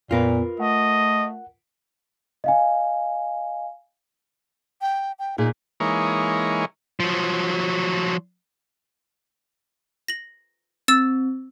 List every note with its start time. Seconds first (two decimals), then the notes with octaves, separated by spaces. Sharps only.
0.11 F2 A#2 B3 F4 A#4 B4
0.60 A3 D#5 F#5
2.44 D#5 F5 G#5
4.81 G5
5.19 G5
5.38 A#2 D#4 G#4
5.80 E3 G#3 A#3 D#4 C#5
7.00 F3 F#3
10.08 A#6 F#7
10.88 C4 E6 A6 E7